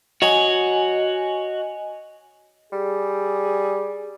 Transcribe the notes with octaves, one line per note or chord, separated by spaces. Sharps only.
F#4 C#5 D#5 G#5
G3 G#4